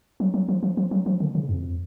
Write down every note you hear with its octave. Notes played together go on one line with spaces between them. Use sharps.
F#3
F#3
F3
F3
F3
F#3
F3
D3
C#3
F2